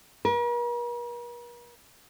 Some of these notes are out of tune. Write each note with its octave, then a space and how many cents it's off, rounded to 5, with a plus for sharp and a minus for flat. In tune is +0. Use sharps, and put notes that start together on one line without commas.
A#4 +45